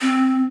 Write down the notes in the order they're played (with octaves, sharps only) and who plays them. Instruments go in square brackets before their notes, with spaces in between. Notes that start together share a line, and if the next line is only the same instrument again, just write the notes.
[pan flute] C4